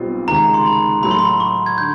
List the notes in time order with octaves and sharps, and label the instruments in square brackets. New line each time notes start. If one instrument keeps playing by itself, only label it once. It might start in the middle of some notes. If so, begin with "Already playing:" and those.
Already playing: [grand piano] B1 B2 G3 C4 F4
[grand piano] C#2 C3 D#3 [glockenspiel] A#5
[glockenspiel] C6
B5
[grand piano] A2 F#3 A3 [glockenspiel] B5
[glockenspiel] C6
B5
C#6
G#6
[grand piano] D3 [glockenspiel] G6